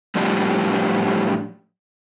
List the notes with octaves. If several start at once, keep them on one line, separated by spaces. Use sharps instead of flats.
A2 F3 G3 D4